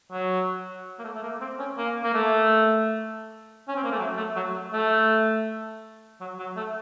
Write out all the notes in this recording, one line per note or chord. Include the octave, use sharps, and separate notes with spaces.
F#3
A#3
A3
A3
A#3
C4
C#4
A#3
A#3
A3
C#4
C4
A#3
A3
F#3
A3
F#3
A3
F#3
F#3
A3